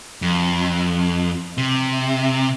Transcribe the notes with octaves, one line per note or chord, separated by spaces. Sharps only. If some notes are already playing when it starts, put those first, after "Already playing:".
F2
C3